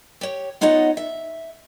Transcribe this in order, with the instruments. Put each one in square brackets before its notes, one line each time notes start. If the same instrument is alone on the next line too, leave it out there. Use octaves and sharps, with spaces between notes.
[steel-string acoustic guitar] G4 C#5
B3 D#4 F4 C#5 D#5 F#5
E5